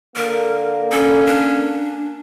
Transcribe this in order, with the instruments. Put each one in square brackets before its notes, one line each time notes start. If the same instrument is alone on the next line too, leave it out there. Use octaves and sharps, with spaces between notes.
[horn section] D3 A#3 [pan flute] A#4
[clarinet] C#4 [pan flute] A4
[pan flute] D4